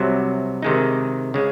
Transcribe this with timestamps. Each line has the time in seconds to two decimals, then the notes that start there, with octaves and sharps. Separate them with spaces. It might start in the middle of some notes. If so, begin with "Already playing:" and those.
Already playing: C2 C3 F#3
0.63 C3 D#3 G#3 D#4
1.34 C#3 G#3